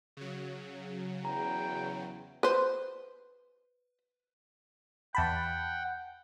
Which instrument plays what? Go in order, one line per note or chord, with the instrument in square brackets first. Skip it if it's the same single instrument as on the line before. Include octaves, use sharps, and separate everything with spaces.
[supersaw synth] C#3 F#3
[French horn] E2 [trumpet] G5 [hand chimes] A#5
[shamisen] B4 C5
[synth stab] E2 A5 B5 [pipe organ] F#5 G5